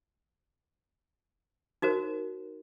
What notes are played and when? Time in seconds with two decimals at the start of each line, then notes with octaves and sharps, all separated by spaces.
1.82 D#4 F#4 A#4 C5